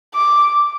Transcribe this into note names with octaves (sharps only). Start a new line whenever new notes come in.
D6